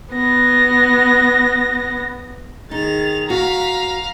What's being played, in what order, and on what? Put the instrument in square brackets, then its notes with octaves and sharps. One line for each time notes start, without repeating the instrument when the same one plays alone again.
[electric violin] B3 A#6
[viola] D#3 G#4 [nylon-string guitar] D#4 [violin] A6 F7
[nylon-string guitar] F#4 [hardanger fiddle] F5 [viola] A#5 [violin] B6